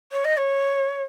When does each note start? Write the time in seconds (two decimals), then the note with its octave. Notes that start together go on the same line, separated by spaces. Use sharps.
0.12 C#5
0.25 D#5
0.37 C#5